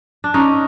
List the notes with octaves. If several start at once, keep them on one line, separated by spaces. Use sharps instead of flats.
D4
C#4 D#4